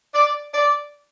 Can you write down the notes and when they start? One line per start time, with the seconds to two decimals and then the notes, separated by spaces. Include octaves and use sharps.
0.14 D5
0.54 D5